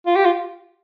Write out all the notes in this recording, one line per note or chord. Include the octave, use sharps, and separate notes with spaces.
F4
G4
F4